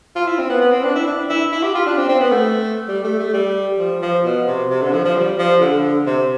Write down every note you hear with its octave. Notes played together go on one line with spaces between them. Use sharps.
F4
E4
C4
B3
B3
C4
D4
E4
D4
E4
E4
G4
F4
D4
C4
C4
B3
A3
G3
A3
A3
G3
F3
F3
B2
C3
C3
D3
F3
F3
G3
F3
D3
C3